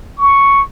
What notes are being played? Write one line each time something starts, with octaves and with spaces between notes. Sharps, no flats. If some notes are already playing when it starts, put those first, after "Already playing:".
C#6